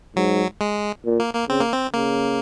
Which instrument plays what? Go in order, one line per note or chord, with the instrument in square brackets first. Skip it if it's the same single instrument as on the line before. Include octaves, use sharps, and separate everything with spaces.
[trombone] G#2 [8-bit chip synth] F#3
[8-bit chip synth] G#3
[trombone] A#2
[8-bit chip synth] A#3
A#3
[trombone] C#3 [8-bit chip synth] C4
[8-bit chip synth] A#3
C4
[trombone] C#3 [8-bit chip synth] A#3